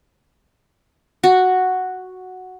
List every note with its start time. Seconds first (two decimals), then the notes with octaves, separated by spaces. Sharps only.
1.24 F#4